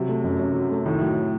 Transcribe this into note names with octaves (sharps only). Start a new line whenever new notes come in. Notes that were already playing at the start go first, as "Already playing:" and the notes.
Already playing: C3 F#3
A3
F#2
F#2
F#3
A3
A2 D#3
F#3